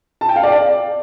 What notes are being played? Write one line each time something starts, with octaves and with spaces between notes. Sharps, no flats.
A5
G5
F5
D5